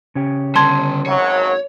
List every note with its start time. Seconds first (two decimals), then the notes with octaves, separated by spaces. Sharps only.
0.15 C#3 C#4 G4
0.55 D3 G3 A5 C6 G#6
1.06 G#1 F#2 F#3 C#5